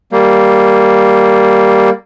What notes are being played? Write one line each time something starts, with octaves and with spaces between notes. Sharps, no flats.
G3 A#3